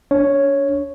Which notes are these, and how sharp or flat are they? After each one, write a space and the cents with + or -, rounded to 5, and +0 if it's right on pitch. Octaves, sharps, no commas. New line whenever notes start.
D4 -35 C#5 +0